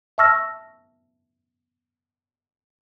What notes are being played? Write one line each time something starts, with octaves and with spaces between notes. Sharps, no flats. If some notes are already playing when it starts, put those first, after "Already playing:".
E5 A5 C#6 E6 F6 A#6